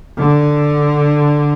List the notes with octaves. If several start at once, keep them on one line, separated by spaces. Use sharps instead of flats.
D3